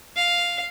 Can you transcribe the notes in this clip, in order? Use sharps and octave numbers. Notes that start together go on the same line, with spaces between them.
F5